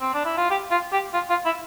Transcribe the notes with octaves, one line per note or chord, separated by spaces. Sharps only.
C4
D4
E4
F4
G4
F4
G4
F4
F4
E4